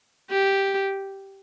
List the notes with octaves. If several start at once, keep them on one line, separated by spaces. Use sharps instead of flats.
G4